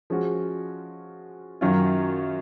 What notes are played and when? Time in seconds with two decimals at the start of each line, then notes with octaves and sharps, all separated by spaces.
0.10 F3 G#3 C#4 F#4
1.61 F#2 D#3 F#3 C#4 F4